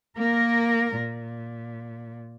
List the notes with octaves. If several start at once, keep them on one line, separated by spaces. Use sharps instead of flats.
A#3 A#4
A#2